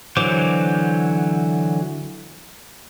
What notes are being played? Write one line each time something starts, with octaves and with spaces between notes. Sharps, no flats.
D3 E3 F#3 C5 D6